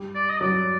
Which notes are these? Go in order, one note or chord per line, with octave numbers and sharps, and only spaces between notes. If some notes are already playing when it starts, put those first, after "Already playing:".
Already playing: G3
D5
D#5
F#3 D5